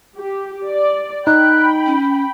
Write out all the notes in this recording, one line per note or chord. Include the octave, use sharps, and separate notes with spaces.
G4
D5
D#4 G5 B5 F#6
C#4